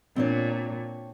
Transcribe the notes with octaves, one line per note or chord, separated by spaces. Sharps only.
A#2 C4 D4 C#5